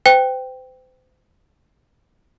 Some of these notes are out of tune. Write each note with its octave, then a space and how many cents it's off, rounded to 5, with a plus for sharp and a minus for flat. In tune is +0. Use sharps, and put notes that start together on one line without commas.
C5 -35 G5 +0